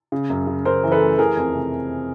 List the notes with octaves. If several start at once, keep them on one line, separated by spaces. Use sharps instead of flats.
C#3
F#2
C#3
C#3 A#4 C5
E3
A4 B4
A3
E3 G#4 A#4
F2
C3